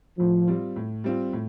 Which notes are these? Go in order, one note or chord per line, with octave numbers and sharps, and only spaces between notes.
A2 F3
G3 C4 F4
A2
G3 C4 F4
A2